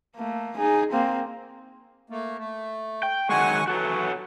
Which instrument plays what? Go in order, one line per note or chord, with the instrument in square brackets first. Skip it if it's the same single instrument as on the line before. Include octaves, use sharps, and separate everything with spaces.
[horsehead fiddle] A3 A#3
D#4 G#4
A#3 C4
[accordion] A3 A#3
A3
[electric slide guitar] G5
[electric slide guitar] D#3 F#3 G#3 [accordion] F#5 G#5 C#6
[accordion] E3 F#3 [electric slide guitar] F#4 A4 C#5